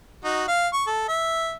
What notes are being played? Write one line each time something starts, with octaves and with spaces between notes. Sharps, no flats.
D#4 F#4
F5
C#6
A4
E5